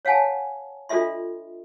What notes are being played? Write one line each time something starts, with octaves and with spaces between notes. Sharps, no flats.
C#5 F5 F#5 G#5 A5
D4 F4 A4 D#5 E5 C6